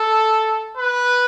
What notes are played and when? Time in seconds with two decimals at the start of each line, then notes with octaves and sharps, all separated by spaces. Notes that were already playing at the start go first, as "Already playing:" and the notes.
Already playing: A4
0.77 B4